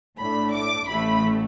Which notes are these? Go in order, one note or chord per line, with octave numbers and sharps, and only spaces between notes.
A2 A3 D4 B5
D6
A1 A2 E3 A3 B5